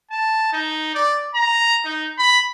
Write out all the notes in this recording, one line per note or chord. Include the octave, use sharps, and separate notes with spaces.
A5
D#4
D5
A#5
D#4
B5